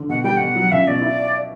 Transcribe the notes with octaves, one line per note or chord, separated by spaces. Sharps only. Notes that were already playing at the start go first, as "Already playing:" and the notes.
Already playing: D3
B2 F#5
G3 G5
B2 F#5
F#3
C#2 E5
B2 D5
E4